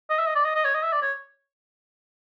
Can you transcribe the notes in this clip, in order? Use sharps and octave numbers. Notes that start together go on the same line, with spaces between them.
D#5
E5
D#5
D5
D#5
D#5
C#5
D#5
E5
D5
C#5